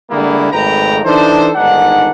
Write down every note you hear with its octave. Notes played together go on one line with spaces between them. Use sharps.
D3 G3 G#3 A#3 B3 E4
G#1 F2 A3 B4 G5 A#5
E3 D4 D#4 A4 C5
G1 G#2 D#3 D4 F#5